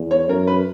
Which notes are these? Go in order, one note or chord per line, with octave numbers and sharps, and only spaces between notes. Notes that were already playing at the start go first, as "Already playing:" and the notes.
Already playing: E2
C#5
F#2 A#4
B4